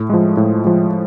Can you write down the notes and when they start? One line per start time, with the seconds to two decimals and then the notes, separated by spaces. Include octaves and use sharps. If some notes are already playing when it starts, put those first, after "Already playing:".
Already playing: A2
0.10 F3 G#3
0.37 A2
0.64 F3 G#3